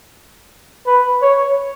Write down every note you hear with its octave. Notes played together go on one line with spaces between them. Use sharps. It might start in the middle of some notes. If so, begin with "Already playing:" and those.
B4
C#5